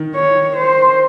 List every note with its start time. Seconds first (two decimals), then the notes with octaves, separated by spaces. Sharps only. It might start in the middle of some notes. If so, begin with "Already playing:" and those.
Already playing: D#3
0.15 C#5
0.56 C5